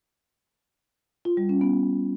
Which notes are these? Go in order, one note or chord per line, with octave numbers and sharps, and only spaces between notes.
F4
G3
C#4
B3